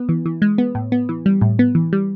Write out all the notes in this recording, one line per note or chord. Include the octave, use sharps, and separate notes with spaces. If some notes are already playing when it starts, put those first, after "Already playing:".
Already playing: B3
E3
E3
G#3
B3
A2
B3
E3
G3
A2
B3
E3
G3